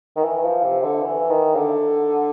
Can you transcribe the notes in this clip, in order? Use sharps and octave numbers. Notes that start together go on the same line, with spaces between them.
D#3
E3
F3
C3
D3
E3
D#3
D3